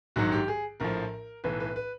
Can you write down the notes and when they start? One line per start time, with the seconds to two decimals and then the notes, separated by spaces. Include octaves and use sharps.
0.16 A#1 G#2 D#3 F#3 F#4
0.32 G4
0.48 G#4
0.80 A#1 A2 F3 A#4
1.44 B1 A2 E3 B4
1.60 B4
1.76 B4